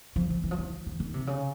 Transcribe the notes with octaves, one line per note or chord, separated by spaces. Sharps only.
F3
F3
E3
F3
E3
D#3
D#3
C3
C#3